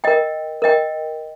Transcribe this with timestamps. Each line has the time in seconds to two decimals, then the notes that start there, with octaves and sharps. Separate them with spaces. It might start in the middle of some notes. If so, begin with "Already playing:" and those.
0.04 A#4 D#5 G5
0.62 A#4 D#5 G5